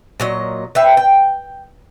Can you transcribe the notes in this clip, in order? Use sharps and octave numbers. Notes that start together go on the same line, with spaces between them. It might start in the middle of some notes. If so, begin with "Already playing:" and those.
A#2 F#3 D#5
B4 E5 G5
G5